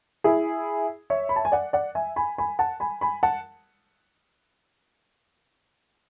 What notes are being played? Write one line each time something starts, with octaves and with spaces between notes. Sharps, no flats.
E4 G#4
C#5 E5
B5
A5
G#5
D5 F#5
D5 F#5
E5 G#5
G#5 B5
G#5 B5
F#5 A5
G#5 B5
G#5 B5
F#5 A5